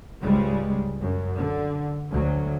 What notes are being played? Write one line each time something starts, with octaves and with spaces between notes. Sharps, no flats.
C#2 G#2 C#3 G3 G#3
F#2
D3
D2 F#3